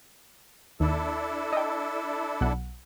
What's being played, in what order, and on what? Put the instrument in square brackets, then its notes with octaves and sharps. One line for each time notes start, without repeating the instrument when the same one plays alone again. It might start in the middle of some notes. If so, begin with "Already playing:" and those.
[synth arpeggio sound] D#2 [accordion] D4 E4 A4
[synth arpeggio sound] D#5 G5
B1 F#5